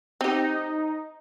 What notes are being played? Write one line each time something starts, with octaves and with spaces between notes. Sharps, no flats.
C4 D#4 G4